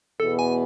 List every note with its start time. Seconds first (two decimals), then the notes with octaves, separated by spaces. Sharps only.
0.19 E2 B2 B3 A4
0.39 G#5